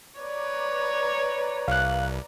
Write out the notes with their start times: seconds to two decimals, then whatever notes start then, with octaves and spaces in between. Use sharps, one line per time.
0.20 B4 C#5 D5 A#5
1.68 C2 F5 F#6